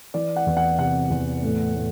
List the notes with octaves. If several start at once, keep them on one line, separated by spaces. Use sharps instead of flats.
E3 D5
F#5
E2
F#5
C3 F#5
E2
A2
A2